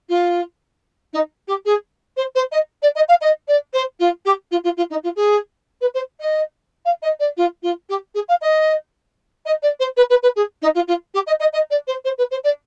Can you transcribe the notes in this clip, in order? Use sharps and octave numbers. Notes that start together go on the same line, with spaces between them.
F4
D#4
G4
G#4
C5
C5
D#5
D5
D#5
F5
D#5
D5
C5
F4
G4
F4
F4
F4
D#4
F4
G#4
B4
C5
D#5
F5
D#5
D5
F4
F4
G4
G#4
F5
D#5
D#5
D5
C5
B4
B4
B4
G#4
D#4
F4
F4
G4
D#5
D#5
D#5
D5
C5
C5
B4
C5
D5